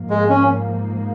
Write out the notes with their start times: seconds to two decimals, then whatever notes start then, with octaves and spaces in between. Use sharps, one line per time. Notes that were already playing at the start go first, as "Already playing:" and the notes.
Already playing: G#2 F3 A#3
0.10 G#3
0.30 C#4